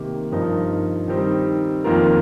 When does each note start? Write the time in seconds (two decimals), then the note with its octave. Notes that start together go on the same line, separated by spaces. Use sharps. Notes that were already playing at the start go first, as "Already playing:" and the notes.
Already playing: C3 D#3 A#3 G4
0.32 G2 F3 D#4 A#4
1.08 D#3 G3 C4 D#4
1.84 F2 D#3 A#3 F4 A#4